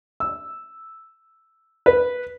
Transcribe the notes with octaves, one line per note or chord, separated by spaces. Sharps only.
E6
B4